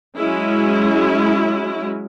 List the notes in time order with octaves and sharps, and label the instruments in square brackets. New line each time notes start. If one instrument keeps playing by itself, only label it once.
[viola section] F#3 G#3 C#4 E4